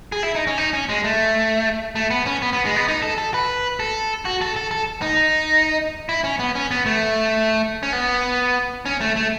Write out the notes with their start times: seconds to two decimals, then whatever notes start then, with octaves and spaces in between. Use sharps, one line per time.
0.12 G#4
0.23 E4
0.35 D#4
0.47 C#4
0.58 D#4
0.73 C#4
0.89 G#3
1.04 A3
1.95 A3
2.10 B3
2.26 C#4
2.42 B3
2.53 B3
2.65 G#3
2.76 B3
2.88 D#4
3.02 A4
3.18 A4
3.34 B4
3.80 A4
4.25 F#4
4.41 A4
4.56 A4
4.71 A4
5.02 D#4
6.09 E4
6.24 C#4
6.39 B3
6.55 C#4
6.71 B3
6.86 A3
7.83 C#4
7.93 B3
8.86 C#4
9.01 A3
9.16 A3